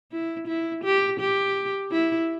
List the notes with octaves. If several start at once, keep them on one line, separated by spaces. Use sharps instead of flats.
E4
E4
G4
G4
E4